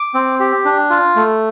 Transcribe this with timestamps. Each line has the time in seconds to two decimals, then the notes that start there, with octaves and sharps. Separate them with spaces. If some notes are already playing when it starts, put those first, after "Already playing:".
Already playing: D6
0.14 C4
0.40 G4
0.65 D4
0.90 F4
1.16 A3